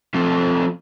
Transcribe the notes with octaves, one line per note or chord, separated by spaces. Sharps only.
F3 A3 C4 A4